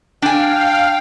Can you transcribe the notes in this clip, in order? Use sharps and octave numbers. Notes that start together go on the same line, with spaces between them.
D4 F5 G5 G#5